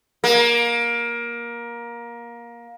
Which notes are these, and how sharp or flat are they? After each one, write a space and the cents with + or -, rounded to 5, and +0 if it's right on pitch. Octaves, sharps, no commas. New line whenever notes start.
A#3 +20